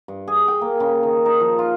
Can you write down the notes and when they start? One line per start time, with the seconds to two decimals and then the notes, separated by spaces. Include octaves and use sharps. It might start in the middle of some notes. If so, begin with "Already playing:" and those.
0.08 G2
0.28 G#4
0.48 G5
0.61 A#3
0.80 C#3
1.03 D#3
1.26 D#4
1.40 F3
1.59 F4